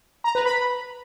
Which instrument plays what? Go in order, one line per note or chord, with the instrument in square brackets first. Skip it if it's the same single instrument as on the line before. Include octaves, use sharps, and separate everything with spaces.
[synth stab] A#5
B4
B5